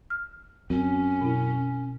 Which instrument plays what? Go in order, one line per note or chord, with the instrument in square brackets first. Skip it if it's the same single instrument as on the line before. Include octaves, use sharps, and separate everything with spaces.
[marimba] F6
[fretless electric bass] F#2 [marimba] C4 [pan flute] C#4
[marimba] B2 E4